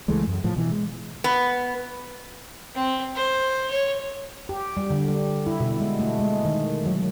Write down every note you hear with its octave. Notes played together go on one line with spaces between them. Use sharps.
C#2 E3 G#3 A3
F#2
A2 F3
B2 E3
G#3
B3
C4
C5
C#5
G4
G3
D3
G3
E4
B2
G#3
A3
G#3
D#3
F#3